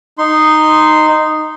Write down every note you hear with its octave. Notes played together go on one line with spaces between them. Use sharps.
D#4 C6